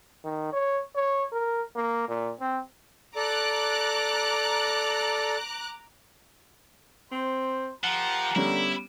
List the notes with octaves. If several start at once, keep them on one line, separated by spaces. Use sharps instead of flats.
D#3
C#5
C#5
A#4
A#3
A#2
C4
A4 D5 A#5 D6 F#6
C4 C5
F3 A#3 G4 F#5 A#5
D3 G3 B3 C#4 E4